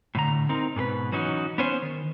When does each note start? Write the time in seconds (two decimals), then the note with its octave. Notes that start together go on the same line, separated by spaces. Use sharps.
0.15 A2 D3 A#5
0.49 C4 D#4 A#4
0.76 G#2 B2 G#4 B4
1.12 E3 F#3 C#4 D#4 F#4
1.58 B3 C#4 C5
1.82 D#3